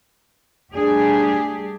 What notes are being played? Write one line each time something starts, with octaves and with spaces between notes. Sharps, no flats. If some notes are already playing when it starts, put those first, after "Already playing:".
G3 A3 D4 G4 G#4